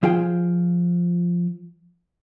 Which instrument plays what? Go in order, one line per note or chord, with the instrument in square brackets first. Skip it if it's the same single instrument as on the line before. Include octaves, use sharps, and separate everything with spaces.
[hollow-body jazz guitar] F3 F4 G#4 G5